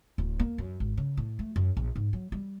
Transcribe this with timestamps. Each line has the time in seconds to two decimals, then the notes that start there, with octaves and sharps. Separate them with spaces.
0.18 D1
0.39 A#3
0.58 F#2
0.80 G#1
0.97 C#3
1.17 A2
1.39 A3
1.56 F#2
1.77 A#1
1.96 G#2
2.13 F#3
2.32 G3